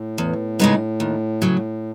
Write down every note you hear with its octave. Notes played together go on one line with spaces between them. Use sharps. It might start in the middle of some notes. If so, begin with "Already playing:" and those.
Already playing: A2
E2
C#3 G#3 B3 D#4
D#2
C#3 F#3